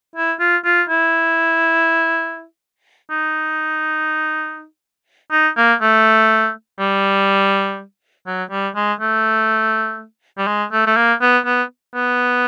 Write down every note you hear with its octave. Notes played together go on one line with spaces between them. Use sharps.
E4
F4
F4
E4
D#4
D#4
A#3
A3
G3
F#3
G3
G#3
A3
G3
G#3
A3
A3
A#3
B3
B3
B3